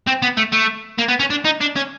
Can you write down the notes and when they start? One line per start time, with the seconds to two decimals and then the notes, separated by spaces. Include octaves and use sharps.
0.07 C4
0.22 B3
0.37 A3
0.53 A3
0.99 A#3
1.09 B3
1.20 C#4
1.30 D4
1.45 D#4
1.60 D4
1.76 C#4